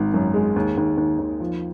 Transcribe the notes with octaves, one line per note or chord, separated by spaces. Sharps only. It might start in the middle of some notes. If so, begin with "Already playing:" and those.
Already playing: G#1 D#3
F#2
G#3
D#2
D#2
D#2
D#2
F3